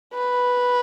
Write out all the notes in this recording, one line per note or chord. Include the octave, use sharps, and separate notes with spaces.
B4